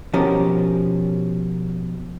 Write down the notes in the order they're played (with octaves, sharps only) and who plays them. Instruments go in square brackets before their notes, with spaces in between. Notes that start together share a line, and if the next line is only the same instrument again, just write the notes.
[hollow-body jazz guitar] B2 F3 C#4 G4 A#4